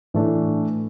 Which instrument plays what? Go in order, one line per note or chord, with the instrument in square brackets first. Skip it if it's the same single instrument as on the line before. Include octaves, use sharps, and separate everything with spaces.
[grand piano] A2 E3 A3 D4